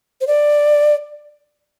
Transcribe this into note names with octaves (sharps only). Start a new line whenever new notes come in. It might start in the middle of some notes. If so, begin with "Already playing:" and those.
C5
D5